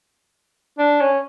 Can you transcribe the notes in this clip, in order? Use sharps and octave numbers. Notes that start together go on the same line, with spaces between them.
D4
C#4